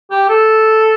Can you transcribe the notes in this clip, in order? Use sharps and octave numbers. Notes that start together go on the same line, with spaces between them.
G4
A4